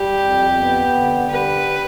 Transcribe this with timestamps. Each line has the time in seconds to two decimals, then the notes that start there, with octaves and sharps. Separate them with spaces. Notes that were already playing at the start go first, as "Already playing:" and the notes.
Already playing: G3 G4
0.18 F2
0.56 B3
0.93 D3
1.30 G3 B4